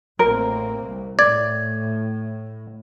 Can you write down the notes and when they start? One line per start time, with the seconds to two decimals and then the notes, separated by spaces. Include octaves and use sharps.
0.19 A1 A#3 C4 A#4
0.84 C2
1.19 A2 D5 G#6